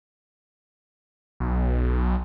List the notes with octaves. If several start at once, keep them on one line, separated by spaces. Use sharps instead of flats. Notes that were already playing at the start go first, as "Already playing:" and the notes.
B1